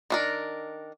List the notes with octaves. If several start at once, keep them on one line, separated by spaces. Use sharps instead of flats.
D#3 D4 A#4